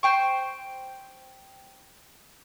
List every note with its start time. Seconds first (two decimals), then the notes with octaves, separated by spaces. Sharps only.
0.03 C5 G5 C#6